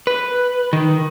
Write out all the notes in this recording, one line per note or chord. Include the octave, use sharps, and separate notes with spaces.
B4
D#3